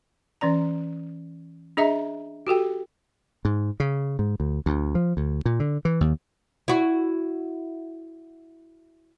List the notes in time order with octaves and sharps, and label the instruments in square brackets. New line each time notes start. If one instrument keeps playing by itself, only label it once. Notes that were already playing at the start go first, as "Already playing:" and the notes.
[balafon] E3 C#4 D5 A#5
D4 G#4 D#5 E5 A#5
F#4 G4 A4 G5
[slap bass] G#2
C#3
G#2
D2
D2
F3
D2
A#2
D3
E3
D#2
[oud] E4 F#4